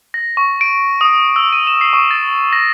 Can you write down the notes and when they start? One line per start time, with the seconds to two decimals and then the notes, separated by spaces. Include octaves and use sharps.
0.14 A#6
0.37 C#6
0.61 D7
1.01 D#6
1.36 E6
1.53 D#7
1.67 E7
1.81 C7
1.93 C#6
2.11 A6
2.53 A#6